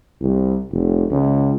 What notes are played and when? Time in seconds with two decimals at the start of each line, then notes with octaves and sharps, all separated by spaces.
0.21 C2
0.71 F1
1.11 C#2